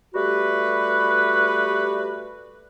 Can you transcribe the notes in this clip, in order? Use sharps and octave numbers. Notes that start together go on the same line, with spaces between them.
G3 A3 F#4 G4 B4